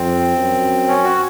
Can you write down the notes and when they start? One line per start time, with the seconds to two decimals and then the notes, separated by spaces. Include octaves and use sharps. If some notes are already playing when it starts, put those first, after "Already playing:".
Already playing: F2 C4
0.37 F#2
0.88 C#4
1.04 F#4